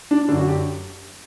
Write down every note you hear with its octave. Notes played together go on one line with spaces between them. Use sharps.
D4
F#2 D3 D4
F#4
G4